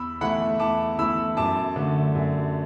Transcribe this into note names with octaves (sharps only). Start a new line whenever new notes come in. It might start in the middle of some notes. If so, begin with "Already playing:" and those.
Already playing: E2 B5 E6
E3 A3 E4 F#5 B5
E2 A5 D6
E3 A3 E4 B5 E6
F#2 A5 D6
D3 A3
F#2